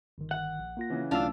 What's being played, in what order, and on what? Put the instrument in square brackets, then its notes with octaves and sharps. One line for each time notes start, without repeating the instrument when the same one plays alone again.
[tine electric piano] G1 D#3
[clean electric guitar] F#5
[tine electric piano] A#1
A#3 F4 A#6
[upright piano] C#3 E3
[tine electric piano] B1 A3 E6 [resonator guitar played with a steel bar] D4 F4